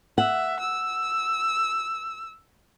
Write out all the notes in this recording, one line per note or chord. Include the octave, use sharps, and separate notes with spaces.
E5 F#5
E6